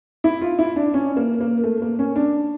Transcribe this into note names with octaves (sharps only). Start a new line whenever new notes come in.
E4
F4
E4
D4
C#4
A#3
A#3
A3
A#3
C#4
D4